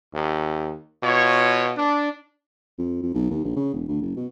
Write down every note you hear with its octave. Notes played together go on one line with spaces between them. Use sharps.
D#2
B2 F4 C#5
D4
F2
F2
B1
D#2
A#1
C#3
E1
D2
F#1
B2